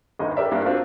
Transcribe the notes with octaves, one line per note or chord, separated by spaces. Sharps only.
G1 D#2 D#5 A#5
G4 A#4 D5 E5
G2 A#3 D4 E4
C4 D4 F4 F#4 A#4 C5